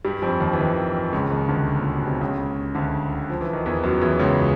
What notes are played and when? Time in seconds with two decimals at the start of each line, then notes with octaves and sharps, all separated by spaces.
0.05 G2 G3
0.22 F2 F3
0.40 D#2 D#3
0.53 E3
0.58 D#2 D#3
1.12 C#2 C#3
1.30 D#2 D#3
1.48 D2 D3
1.79 A#2
1.93 B2
2.07 C3
2.21 C#2 C#3
2.75 D2 D3
3.30 F3
3.41 E3
3.53 D#3
3.66 E2 E3
3.83 F#2 F#3
4.01 E2 E3
4.19 C#2 C#3